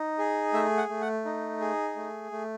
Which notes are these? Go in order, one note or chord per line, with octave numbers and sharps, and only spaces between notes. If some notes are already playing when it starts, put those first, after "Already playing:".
Already playing: D#4
G#4
A3 E5
F#5
A3
F#5
D#4
G#4
A3
A3